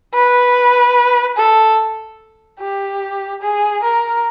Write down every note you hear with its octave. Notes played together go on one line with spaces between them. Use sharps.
B4
A4
G4
G#4
A#4